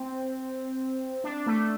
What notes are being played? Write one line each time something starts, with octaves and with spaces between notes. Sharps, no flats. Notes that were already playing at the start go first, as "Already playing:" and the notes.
Already playing: C4
D4
A3